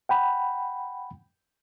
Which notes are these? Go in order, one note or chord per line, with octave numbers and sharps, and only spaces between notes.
F#5 G5 B5